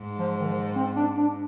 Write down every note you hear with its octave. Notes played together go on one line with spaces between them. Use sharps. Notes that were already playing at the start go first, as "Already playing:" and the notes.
Already playing: G#2
F3
D#3
F3
C4
D4
D4